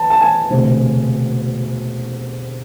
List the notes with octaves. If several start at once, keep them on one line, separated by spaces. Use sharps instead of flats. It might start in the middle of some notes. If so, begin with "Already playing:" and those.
Already playing: A5
A5
G#5
E1 D2 C3